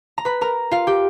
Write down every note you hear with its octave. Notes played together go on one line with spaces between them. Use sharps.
A#5
B4 B5
A#4 A#5
F4 F5
G4 G5